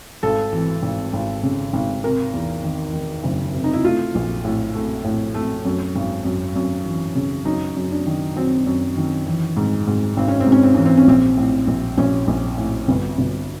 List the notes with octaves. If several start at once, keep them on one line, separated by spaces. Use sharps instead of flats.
G#1 A4
E3
G#1
G#1
C#3
G#1
C3 A#4
E2
D#3
D#3
F#1
C3
D#4
E4
A3 F4
A#1
A2
A3
A2
A3
F#2
G#1
F#2
F#2
E3
C#3
F#2 D#4
F#2
D4
D#3
F#3 C4
F#2
D#3
E3
G#2
G#2
G#1 C4
C#4
C4
G#2
C#4
C4
E3 C#4
C4
C#4
A#1 C4
A2
A#1
A#1 C#4
A#1
A2
G1
G1